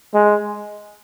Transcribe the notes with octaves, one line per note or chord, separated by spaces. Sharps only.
G#3